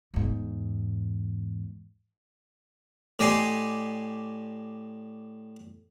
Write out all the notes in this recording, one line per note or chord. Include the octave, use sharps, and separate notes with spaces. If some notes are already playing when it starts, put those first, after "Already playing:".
E2 G#2
A2 G4 D5 D#5 G#5 C6